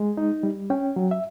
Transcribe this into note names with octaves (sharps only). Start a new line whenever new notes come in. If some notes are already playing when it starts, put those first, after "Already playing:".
Already playing: G#3
D#4
G3
C#4 G5
F#3
E5